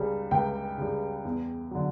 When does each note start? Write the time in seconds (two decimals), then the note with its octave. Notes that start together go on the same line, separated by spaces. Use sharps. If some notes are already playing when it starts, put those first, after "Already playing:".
Already playing: C#2 C#3 G3
0.31 C#2 G5
0.78 C#3 G3
1.25 E2
1.71 D3 F#3